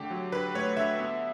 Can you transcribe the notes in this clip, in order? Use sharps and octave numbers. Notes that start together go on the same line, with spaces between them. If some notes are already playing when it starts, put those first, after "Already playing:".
Already playing: D3 A3 G4
F#3
D3 B4
A3 C#5
D3 E5
B3